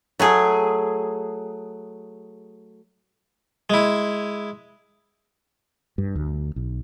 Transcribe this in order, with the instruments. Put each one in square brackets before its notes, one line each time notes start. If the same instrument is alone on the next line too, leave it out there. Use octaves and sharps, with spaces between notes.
[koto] F#3 A3 G#4
[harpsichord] G#3 E4
[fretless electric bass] G2
D2
B1